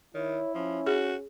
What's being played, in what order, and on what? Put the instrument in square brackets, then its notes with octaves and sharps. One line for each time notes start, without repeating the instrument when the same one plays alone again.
[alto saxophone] D#3 [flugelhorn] E4 [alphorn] C#5
[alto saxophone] F3 [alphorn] C#4
[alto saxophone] F#4 [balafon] G#4